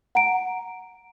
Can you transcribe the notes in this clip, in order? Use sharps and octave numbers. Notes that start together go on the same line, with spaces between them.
F#5 A#5 D7